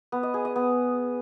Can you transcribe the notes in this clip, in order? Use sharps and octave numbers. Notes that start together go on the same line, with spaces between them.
B3
D#5
G#4
D#5
B3